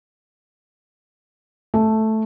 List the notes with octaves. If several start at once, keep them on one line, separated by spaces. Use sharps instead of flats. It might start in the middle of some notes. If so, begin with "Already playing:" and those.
A3